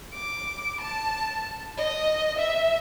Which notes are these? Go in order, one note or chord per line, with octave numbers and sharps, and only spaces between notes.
D6
A5
D#5
E5